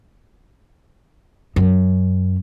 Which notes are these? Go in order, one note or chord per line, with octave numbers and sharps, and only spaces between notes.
F#2